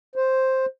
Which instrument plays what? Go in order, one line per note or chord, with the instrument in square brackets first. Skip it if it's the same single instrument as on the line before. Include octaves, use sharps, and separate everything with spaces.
[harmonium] C5